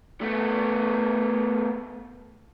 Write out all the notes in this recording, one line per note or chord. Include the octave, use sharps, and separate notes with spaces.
A3 B3